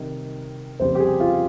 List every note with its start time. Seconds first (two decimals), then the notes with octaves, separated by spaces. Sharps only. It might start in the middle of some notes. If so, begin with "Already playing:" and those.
Already playing: C3 D#3 G3
0.80 F2 C#3 G3 C5
0.95 G4
1.00 G#4
1.20 F4